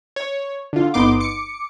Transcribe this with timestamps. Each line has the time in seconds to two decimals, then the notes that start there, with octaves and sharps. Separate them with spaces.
0.16 C#5
0.73 D3 F4
0.94 G1 B3 D#4 C6 D6
1.20 D6 C#7